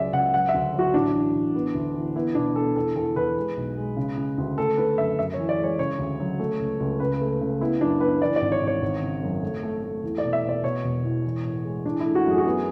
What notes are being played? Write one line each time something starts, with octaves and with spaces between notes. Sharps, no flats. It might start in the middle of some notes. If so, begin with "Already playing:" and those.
Already playing: C#2 F#3 G#3 D5 E5
C#2 F#5
F#3 F#5
E5
D2
F#3
F#4
A1 D4
E3
A1
B3
D2
E3
B3 E4
B2 D4
B3 A4
E2 A4
E2 A4
E2 B4
G#3
B1
G#3
C#3
C#3
D2
A3 A4
D3 B4
F#2 E5
F#2 E5
E3 C#5
D5
G#3
C#5
C#3 C#5
D2
F#3
A3
C#2
C#2
C#3 B4
A3
C#3
B3 E4
F#2 D4
B3 B4
E3 D5
D5
G#1
C#5
G#1
C#5
G#1
C#3
F#2
A3
A3
A3
E2
D5
B2
E5
B2
D5
B2 C#5
E1
E2
E3
A2
G#3
E3 D4
A3 E4
F#4
F#2 G#4
F#4
B3 G#4